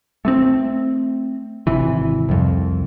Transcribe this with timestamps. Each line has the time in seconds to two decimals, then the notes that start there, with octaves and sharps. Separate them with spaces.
0.25 A3 B3 C4
1.67 G#1 C3 E3
2.29 C2 F2